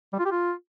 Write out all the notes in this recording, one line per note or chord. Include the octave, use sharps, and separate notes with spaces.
G3
F4
G4
F4